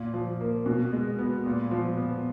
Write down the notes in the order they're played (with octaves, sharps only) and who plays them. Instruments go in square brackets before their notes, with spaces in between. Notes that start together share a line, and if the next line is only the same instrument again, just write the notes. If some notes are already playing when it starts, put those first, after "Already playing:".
Already playing: [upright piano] A#2
F3
A#3
B2
G#3
B3
A#2
F3
B3